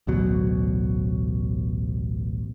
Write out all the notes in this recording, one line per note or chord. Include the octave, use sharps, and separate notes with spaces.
A1 D2 B2 F#3